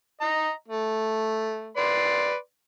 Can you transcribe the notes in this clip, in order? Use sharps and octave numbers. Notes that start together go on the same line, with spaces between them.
D#5 A#5
A3
B4 D5 C6